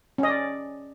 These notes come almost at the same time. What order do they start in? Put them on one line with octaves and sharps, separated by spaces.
C#4 D#5 D5